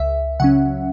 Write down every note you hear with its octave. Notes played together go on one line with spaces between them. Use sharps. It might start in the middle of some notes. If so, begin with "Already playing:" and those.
Already playing: C#2 E5
C#3 F#3 C#4 F#5